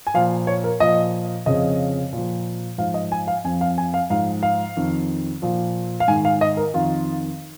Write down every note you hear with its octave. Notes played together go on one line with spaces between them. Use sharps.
G#5
A#2 F3 F5
C#5
A#4
A#2 F3 D#5
F2 C#3 F3 D#5
A#2 F3
G#2 F3 F5
D#5
G#5
F5
F2 F3 G#5
F5
G#5
F5
G#2 F3 F5
F5
F2 D#3
A#2 F3
F5
G#2 D#3 G#5
F5
D#5
A#4
F2 D#3 F4